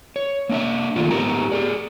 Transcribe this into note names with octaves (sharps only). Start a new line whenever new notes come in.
C#5
A#3 D4 D#5 E5
D#3 A3 A#3 D4 F4
G#2 B3 G4 A#4 A#5
G4 G#4 D5